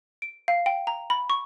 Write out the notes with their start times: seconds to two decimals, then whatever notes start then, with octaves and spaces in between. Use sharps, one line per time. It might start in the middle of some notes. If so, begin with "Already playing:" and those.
0.22 D7
0.48 F5
0.66 G5
0.87 A#5
1.10 B5
1.30 C#6